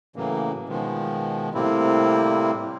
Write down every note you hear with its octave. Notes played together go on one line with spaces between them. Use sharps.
A2 C#3 E3 F#3 A#3
B2 D#3 F3 G#3
A2 C3 G3 A#3 C4 E4